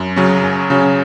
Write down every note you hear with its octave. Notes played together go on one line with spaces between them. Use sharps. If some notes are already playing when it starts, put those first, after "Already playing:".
Already playing: F#2
C#3 F#3 C#4
F#2
C#3 F#3 C#4